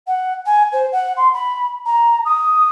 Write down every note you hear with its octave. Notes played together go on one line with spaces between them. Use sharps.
F#5
G#5
C5
F#5
C6
B5
A#5
D#6